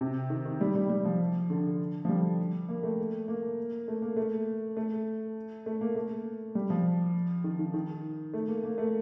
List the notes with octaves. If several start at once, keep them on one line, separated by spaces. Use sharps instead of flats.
C3
D#3
D#3
G3
G3
G3
F3
D3
F3
G3
A#3
A3
A#3
A3
A#3
A3
A3
A3
A#3
A3
G3
F3
D#3
D#3
D#3
A3
A#3
A#3
A3